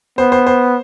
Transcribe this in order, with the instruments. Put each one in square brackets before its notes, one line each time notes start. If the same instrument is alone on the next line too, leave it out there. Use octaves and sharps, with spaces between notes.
[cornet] B3 [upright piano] C5
[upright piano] C5
C5